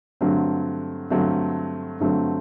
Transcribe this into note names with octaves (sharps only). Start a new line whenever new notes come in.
G2 D3 F#3 A3 C4
G2 D3 F#3 A3 C4
G2 D3 F#3 A3 C4